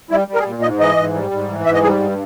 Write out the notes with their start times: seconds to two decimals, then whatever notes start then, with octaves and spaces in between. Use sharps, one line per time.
0.11 G3 E4
0.28 G3
0.34 A#4
0.39 G#4
0.45 A#2
0.62 G#2 D#5
0.79 E3 D#5
0.96 G#2
1.14 G3
1.31 G#2
1.48 E3
1.66 G#2 E5
1.74 D#5
1.83 G3 G#4
2.00 G2